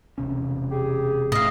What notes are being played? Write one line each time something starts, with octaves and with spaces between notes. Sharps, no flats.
E1 C3 C#4
G4 G#4
A2 A3 D#5 F5